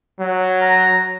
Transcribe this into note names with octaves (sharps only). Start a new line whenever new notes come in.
F#3
A#5